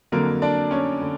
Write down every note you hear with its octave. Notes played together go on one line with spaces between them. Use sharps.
F2 D3 F#3 A#3 A#4
D4 D5
C#4 C#5
D3